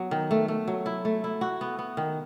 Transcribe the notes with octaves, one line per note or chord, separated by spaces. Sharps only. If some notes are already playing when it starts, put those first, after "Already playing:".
Already playing: F#3 B3
D#3
A3
A3
F#3
E4
A3
E4
F#4
B3
B3
D#3